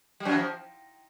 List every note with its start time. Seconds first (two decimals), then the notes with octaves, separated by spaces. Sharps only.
0.20 G3
0.25 F#2 F#3
0.31 E3
0.38 F3